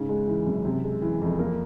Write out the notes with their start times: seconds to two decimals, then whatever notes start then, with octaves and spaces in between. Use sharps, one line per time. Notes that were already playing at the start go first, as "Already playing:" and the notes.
Already playing: G#2 C#3
0.09 G#3
0.28 E3
0.47 F#2
0.65 C3
0.84 G#3
1.02 E3
1.21 F2
1.39 A#3